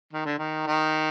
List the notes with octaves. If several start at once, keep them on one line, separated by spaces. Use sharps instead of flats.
D#3
D3
D#3
D#3